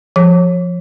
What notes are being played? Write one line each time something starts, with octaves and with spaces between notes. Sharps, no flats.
F3